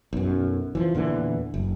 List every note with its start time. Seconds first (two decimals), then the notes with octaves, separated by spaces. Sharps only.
0.13 B1 F#2
0.75 E3 F3
0.94 E2 A#2 D3 E3
1.54 F#1